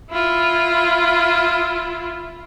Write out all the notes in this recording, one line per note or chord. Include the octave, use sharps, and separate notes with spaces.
E4 F4